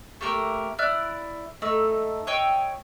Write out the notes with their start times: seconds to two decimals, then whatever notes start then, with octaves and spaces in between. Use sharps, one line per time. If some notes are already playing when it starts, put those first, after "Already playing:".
0.21 A3 A#3 G4 A#4
0.79 E4 D5 F6 F#6
1.62 A3 D#4 E6
2.27 C#5 D#5 G5 E6